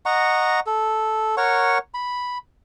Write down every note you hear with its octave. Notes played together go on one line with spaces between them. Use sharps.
D#5 F#5 A#5 C#6
A4
A#4 C#5 F#5 C#6
B5